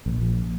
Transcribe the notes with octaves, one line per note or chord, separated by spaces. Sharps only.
A#1